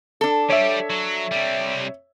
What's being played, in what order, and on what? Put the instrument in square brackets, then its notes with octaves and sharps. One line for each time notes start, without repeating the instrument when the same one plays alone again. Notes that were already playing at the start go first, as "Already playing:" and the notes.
[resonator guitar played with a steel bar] D4 A4
[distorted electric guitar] G3 G4 [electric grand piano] C#5 E5
[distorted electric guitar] F#3
C3 G3